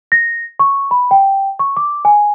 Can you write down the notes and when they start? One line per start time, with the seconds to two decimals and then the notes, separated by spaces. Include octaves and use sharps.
0.12 A#6
0.60 C#6
0.91 B5
1.11 G5
1.59 C#6
1.77 D6
2.05 G#5